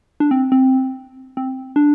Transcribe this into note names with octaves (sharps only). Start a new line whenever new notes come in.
D4
C4
C4
C4
D4